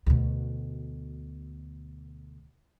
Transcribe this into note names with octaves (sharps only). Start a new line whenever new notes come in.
D2 B2